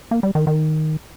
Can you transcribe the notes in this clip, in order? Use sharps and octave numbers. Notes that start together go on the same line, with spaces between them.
A#3
G3
D#3
D#3